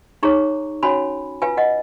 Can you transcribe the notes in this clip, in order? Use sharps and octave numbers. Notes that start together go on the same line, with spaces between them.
D#4 G#4 C#5 A#5 C#6
C#4 F#4 C#5 G#5 B5
F4 B4 F5 G#5
D#5 F#5